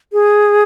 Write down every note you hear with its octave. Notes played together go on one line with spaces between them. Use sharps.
G#4